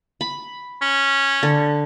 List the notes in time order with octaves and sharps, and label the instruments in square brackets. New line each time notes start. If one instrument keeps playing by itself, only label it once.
[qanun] B5
[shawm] C#4
[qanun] D3